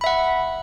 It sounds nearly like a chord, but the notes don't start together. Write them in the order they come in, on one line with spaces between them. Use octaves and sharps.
B5 E5 F#5